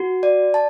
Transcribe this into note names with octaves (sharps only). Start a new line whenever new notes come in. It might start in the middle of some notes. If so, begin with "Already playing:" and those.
Already playing: F#4
D5
A5